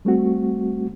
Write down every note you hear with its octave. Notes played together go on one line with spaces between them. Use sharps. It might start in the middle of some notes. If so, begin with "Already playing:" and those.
G3 A3 C4 F#4